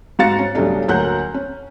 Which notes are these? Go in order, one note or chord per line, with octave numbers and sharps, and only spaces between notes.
G#2 F#4 F5 A6 C#7
C#4
B1 C#3 F#3 G3 A3 D4
D2 F#3 A#3 F#5 F#6 G6
C#4